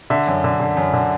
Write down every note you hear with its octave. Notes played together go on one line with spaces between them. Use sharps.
D3 E5
F#2
D3
D3
F#2
D3